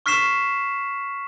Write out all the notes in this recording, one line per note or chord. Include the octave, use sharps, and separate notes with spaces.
C#6 F6 B6 C7 E7